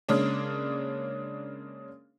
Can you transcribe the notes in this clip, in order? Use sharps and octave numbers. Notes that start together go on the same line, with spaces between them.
C#3 G#3 A#3 C#4 D4